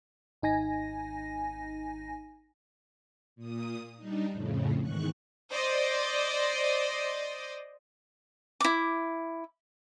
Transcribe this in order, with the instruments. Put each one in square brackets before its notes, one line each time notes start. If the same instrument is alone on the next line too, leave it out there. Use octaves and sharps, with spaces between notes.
[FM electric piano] G#1 D#4 G#5 A#6
[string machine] A#2 D#6
G3 D4 D#4
F2 A2 C#3
E2 G#2 D#3 C#6 F#6
[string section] C5 D5 D#5
[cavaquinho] E4 D6